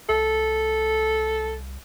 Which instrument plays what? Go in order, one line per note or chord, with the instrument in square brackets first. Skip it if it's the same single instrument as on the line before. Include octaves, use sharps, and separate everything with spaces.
[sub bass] C2 [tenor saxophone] A4